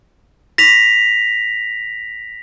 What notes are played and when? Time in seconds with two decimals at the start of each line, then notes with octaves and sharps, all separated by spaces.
0.58 A#6 B6 F7